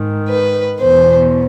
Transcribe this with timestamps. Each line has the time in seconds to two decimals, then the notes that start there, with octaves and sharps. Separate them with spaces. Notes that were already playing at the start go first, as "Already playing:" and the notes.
Already playing: G#2 D#3
0.29 B4
0.80 E2 B2 C5